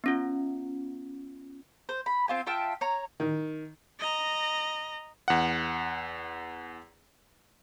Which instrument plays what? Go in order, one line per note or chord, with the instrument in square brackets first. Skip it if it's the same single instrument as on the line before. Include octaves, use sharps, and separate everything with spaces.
[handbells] B3 C#4 F4
[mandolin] C5
B5
C4 F4 G#5
F4 E5 G5 A5
C#5 A#5
[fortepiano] D#3
[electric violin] D#5 A#5
[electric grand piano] E2 F#5